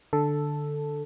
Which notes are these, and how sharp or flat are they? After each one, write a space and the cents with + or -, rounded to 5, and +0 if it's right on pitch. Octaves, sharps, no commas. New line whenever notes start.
D3 +10 A4 +0